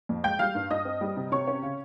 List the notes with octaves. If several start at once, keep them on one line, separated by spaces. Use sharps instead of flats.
F2
G#3 G5 G6
G3 F5 F6
G2
G2 D#5 D#6
C4
G3
C3
C3 C#5 C#6
C#4
C#3